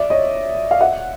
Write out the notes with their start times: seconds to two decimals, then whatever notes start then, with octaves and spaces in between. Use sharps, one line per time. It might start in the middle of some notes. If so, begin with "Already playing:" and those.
Already playing: D5 E5
0.10 C#5 D#5
0.71 F5
0.81 E5 F#5